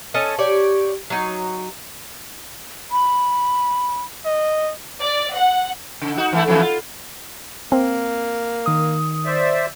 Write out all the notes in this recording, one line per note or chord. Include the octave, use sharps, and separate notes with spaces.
C#4 A4 D#5
G4 C#5 D5
F#3 D#4
B5
D#5
D5
F#5
C#3
D#4 F#4
E3 A3 E4
F2 E3 A3
F4
A#3 C4
D#3 D#6
C5 D5 E5